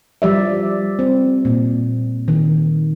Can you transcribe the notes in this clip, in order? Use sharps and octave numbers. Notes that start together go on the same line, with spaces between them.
F3 G3 D5 E5
C4
A#2
D#3